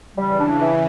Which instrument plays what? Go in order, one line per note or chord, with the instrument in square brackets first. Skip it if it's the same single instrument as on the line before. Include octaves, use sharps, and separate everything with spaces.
[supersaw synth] C#3 E3 [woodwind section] G3
[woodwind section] D4
E3